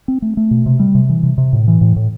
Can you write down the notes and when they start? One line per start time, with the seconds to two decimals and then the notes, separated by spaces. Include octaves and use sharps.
0.08 C4
0.22 A3
0.37 A3
0.51 B2
0.66 C3
0.80 G3
0.95 C3
1.09 E3
1.23 C3
1.38 C3
1.53 A2
1.68 E3
1.81 A2
1.96 A2